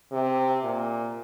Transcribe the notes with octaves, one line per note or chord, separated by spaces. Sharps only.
C3
A#2